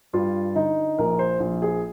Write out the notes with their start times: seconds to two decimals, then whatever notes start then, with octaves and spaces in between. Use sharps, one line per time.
0.13 G2 F4
0.55 D3 D#4
0.98 A#1 A#4
1.19 C5
1.40 A#1
1.62 G#4